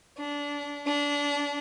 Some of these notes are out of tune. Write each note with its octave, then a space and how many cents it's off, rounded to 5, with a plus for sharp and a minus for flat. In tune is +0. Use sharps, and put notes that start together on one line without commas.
D4 -25
D4 -25